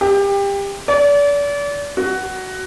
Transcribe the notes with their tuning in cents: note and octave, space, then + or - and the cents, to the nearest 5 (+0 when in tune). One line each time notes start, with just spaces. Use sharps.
G4 +25
D5 -35
F#4 +15